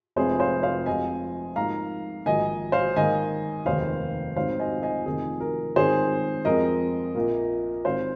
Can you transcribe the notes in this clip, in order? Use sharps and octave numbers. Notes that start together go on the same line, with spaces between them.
F1 F2 C3 G#3 G#4 C5
C5 F5
C5 F5
F2 C3 F3 G#3 C4 D#5 G#5
G#2 F3 A#3 F5 A#5
A#1 G#2 D#3 D#5 G#5
C5 F5
G#2 D#3 A#3 D#5 G#5
F1 D#2 D#3 G#3 C5 F5
G#2 D#3 C4 C5 F5
D#5 G#5
D#5 G#5
F1 F2 D#3 A#3 G#4
A#4
G#2 D#3 G#3 C4 G#4 C5
F2 F3 G#3 C4 A#4 D#5
A#1 A#2 A#3
G#2 D#3 C4 C5 F5